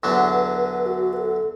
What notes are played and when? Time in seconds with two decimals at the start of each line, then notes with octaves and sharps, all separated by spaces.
0.03 E2 D3 F#3 D4 B4
0.86 F#4
1.13 B4
1.16 A4